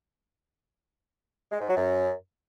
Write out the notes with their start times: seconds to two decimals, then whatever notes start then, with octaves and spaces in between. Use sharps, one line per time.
1.51 G#3
1.60 G#2
1.68 F#3
1.77 F#2